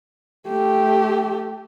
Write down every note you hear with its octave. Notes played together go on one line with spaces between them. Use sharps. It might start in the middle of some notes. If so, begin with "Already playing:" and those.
A3 G4